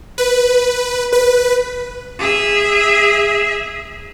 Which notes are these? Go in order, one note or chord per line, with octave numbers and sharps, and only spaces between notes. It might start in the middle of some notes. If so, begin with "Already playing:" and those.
B4
B4
G#4 E5